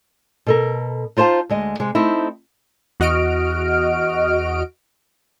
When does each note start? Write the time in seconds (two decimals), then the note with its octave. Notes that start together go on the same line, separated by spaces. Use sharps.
0.46 B2 A4 A#4
1.17 D#4 F4 C5 F5 A5
1.49 D2 G#3 D#5
1.79 C3 G#3
1.95 A3 C4 D#4 E4
3.00 E2 F#4 D#5 F6 D7